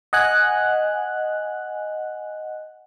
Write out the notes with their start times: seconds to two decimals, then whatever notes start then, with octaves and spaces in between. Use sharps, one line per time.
0.13 D#5 F#5 G#5 F#6